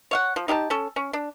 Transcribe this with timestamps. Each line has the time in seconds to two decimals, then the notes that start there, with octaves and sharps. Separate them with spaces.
0.11 C#5 F5 F#5
0.36 F3
0.48 D#4 G4 F5 A5
0.70 C#4 A4
0.96 C#4
1.13 D4